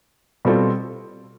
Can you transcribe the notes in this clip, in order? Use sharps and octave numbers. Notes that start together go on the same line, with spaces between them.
B2 G3 C4 F4 A4